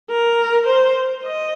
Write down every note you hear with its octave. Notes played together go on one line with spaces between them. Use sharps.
A#4
C5
D#5